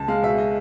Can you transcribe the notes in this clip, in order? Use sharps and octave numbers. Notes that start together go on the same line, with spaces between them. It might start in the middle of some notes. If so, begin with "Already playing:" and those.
Already playing: C#2 A5
G#3 F5
B2 E5
D#5